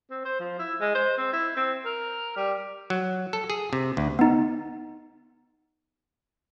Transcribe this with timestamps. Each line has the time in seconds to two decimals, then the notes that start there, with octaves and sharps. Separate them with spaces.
0.11 C4
0.25 C5
0.40 F3
0.59 E4
0.80 G#3
0.95 C5
1.18 C4
1.33 E4
1.56 C4
1.85 A#4
2.36 G3
2.90 F#3
3.33 A4
3.50 G#4
3.73 C3
3.97 D2
4.19 B3 D#4